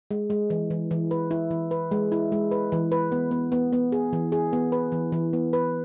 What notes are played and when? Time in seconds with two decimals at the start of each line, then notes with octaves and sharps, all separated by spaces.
0.11 G#3
0.30 G#3
0.50 E3
0.71 E3
0.91 E3
1.11 B4
1.31 E4
1.51 E3
1.71 B4
1.91 G#3
2.12 E4
2.32 G#3
2.51 B4
2.72 E3
2.92 B4
3.12 B3
3.31 B3
3.52 B3
3.73 B3
3.92 G#4
4.13 E3
4.32 G#4
4.53 B3
4.72 B4
4.92 E3
5.12 E3
5.33 B3
5.53 B4